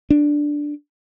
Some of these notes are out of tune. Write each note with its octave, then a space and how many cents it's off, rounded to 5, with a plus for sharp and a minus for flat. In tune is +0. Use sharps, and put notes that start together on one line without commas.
D4 +0